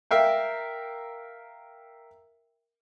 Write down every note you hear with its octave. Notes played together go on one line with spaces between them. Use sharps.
A#4 E5 F5 G5